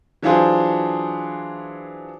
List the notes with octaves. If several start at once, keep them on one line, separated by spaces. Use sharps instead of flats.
E3 F#3 D4 F4 G#4 C5